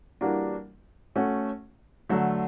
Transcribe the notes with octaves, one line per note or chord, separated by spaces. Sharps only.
E3 G3 A#3 D4 F#4
A3 C#4 F#4
D3 F#3 A3